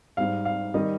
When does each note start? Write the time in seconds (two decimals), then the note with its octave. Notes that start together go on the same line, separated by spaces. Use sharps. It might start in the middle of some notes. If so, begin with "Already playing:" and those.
0.17 G#2 G3 F5
0.45 F5
0.74 D#3 G3 D#5